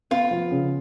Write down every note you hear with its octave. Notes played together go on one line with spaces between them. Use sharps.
B3 F4
F3
C#3